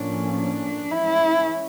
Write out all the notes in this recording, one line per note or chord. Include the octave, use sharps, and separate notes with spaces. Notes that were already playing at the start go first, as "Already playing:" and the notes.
Already playing: A2 F3 A#3 C#4 D4
D4
E3 G#3 C#4 E4